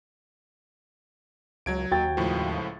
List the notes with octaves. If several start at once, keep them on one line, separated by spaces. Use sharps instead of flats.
C#2 F#3 G#6 D7
D#2 F#4 G5 A6
C#2 A2 F3